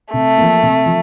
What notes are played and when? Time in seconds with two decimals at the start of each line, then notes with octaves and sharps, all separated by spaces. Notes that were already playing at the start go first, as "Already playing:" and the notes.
0.13 C3 A3
0.38 F3 A#3
0.63 C3
0.86 F3